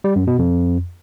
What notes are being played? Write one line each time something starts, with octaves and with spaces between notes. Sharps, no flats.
G3
F#2
B2
F2